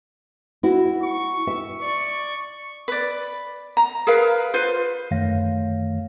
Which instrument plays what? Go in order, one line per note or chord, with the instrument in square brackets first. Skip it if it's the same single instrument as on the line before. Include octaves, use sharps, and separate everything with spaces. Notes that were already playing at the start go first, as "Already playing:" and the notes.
[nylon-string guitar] E4 F#4
[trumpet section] C#6
[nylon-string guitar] E5
[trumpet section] D5 C#6
[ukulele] B4 D5
A#5
G#4 A#4 B4 F5
F4 B4 C5
[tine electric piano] F#2 D#3 A3 C#5 F5 A#6